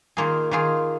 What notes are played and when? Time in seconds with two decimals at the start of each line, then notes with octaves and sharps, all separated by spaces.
0.17 D#3 A#3 F4 G#4
0.51 D#3 A#3 F4 G#4